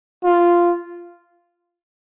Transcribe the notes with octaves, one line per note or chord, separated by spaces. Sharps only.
F4